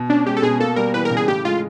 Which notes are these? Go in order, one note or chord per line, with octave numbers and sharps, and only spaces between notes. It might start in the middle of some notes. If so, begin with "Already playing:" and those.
Already playing: B2
C#4 D4
G#3 G4
A4
B2 G#4
A#3 A4
G3 A#4
E3 B4
A#4
C#3
G#4
A2 G4
G#3 F4